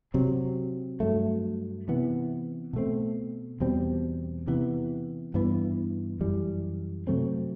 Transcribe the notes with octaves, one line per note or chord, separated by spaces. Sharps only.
C3 F#3 C4
G2 F#3 A3
C3 E3 B3
B2 A3 C4
E2 B2 G3 C4
C3 E3 B3
G2 E3 B3
F#2 E3 G3
C3 F#3 A3 C4